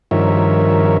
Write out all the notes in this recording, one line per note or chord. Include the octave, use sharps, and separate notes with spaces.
G2 D#3 F3 A#4 C#5 E5